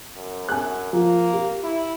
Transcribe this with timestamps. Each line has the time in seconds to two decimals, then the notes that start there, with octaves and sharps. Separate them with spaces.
0.16 F#2
0.49 G#5 F#6
0.93 F3 A#3
1.33 G4
1.63 E4